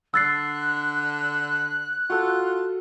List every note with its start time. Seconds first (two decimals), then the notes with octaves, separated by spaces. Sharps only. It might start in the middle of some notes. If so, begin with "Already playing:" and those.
0.14 D3 E6 F#6 A6 C7
2.10 F4 F#4 A4